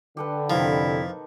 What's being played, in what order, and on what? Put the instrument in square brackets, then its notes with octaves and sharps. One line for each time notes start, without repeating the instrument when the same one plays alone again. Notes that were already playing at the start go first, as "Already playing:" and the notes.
[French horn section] D3 [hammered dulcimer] G4 A4 B4
[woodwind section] F2 C3 E4 [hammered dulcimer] D#3 [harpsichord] F3